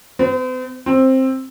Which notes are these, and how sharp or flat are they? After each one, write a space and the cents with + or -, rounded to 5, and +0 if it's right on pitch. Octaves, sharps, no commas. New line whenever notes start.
C4 -45
C4 +10